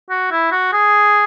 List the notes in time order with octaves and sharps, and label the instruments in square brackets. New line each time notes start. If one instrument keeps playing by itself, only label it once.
[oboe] F#4
E4
F#4
G#4